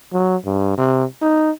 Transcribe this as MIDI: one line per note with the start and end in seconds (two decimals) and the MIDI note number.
0.13 0.36 54
0.46 0.77 43
0.78 1.04 48
1.21 1.51 63